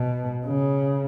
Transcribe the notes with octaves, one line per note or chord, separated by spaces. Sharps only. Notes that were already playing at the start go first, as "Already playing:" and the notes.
Already playing: B2
C#3